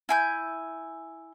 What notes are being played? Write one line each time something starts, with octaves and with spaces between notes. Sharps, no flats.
E4 G#5 G6